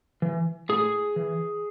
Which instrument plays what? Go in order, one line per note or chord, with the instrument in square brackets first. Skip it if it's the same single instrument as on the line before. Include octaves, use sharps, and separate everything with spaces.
[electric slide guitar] E3
A2 G#4
E3